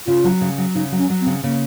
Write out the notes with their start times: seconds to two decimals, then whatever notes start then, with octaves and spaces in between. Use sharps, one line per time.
0.07 C#3 F4
0.24 F#3
0.41 C#3
0.58 F#3
0.75 C#3 D#4
0.92 F#3
0.98 C#4
1.10 F#3
1.21 C4
1.26 C#3
1.43 C#3 A#3